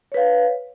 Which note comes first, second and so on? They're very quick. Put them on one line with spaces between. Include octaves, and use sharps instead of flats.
C#5 B4 F5